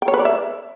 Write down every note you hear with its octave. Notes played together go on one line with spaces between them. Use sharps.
G5
C#5
B4
D5
E5